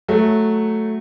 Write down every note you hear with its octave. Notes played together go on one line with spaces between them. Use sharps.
F#3 A3